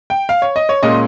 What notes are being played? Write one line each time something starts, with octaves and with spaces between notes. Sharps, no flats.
G5
F5
C#5
D#5
C#5
A#2 G#3 C#4 F4 D#5